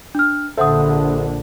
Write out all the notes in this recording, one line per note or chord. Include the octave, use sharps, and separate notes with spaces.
D4 F6
A#1 D3 A4 C5 E5 F#5 D#6